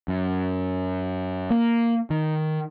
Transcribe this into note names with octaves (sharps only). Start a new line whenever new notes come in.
F#2
A#3
D#3